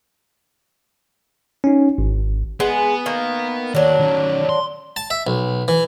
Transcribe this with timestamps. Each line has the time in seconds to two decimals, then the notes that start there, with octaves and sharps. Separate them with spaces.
1.64 C#4 D#4
1.98 G#1
2.60 G#3 B3 F#5
3.06 D#3 A#3
3.75 D#2 F#3 D4
3.99 D#3 C#4
4.49 C6
4.96 A5
5.10 E5
5.27 B1
5.68 E3